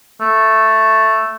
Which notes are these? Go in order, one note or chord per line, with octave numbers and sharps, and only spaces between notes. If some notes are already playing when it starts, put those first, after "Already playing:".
A3